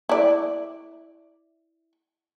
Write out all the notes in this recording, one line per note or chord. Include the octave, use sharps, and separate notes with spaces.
E4 D5